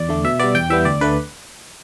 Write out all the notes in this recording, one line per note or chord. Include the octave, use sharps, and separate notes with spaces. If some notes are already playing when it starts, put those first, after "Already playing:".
Already playing: E2 D5
D3 A3
B2 E5
G3 B3 D5
E2 G5
E3 G3 B3 E5
D2 D5
D3 A3 B4